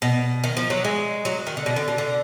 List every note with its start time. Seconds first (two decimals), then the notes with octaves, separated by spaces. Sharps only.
0.02 B2
0.44 D#3
0.57 F3
0.70 F#3
0.85 G#3
1.25 F#3
1.47 D#3
1.57 D3
1.66 B2
1.76 D3
1.88 B2
1.98 D3